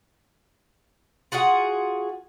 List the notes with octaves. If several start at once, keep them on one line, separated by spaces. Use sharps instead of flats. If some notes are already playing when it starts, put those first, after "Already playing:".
F4 F#4 G#4 F#5